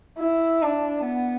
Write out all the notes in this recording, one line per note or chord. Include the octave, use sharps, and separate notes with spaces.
E4
D4
B3